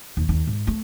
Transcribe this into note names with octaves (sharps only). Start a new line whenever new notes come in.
D#2
D#2
G#2
A3